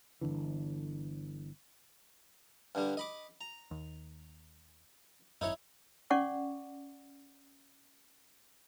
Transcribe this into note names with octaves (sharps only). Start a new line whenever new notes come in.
G1 C#2 D3 E3
G2 D3 G3
D#5 B5 D6
A#5
D#2
G#1 F#2 D#4 E4 C#5
C#4 D5 F#5 C#6 D6